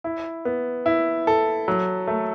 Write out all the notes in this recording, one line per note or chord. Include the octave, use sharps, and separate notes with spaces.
E4
B3
E4
A4
F#3
A3